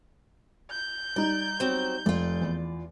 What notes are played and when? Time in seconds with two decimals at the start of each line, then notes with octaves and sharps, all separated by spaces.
0.71 G6
1.16 G3 D#4 D5
1.60 F#3 C4
2.06 F1 F4 D5
2.42 E2